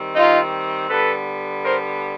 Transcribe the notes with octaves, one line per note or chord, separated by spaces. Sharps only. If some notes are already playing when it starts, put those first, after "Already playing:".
Already playing: D#3 G3 C4
D#4 F4
D3 G3 B3 A4 B4
A#4 C5